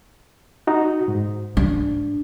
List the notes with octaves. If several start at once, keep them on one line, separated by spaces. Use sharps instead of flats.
D#4 F#4
G#2
D4